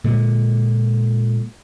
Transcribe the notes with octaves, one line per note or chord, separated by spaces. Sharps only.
A#2 D3 G#3